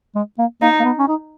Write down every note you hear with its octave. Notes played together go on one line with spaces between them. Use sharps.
G#3
A#3
A#3 D#4
A#3
B3
C#4
D#4